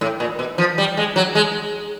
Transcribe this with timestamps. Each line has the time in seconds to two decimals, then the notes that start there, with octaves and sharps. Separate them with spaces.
0.01 A2
0.20 A#2
0.39 B2
0.58 F3
0.78 G3
0.97 G#3
1.16 F#3
1.35 G#3